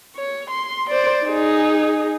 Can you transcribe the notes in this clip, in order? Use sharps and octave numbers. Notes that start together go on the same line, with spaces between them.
C#5
C6
C5 D5
D#4 G#4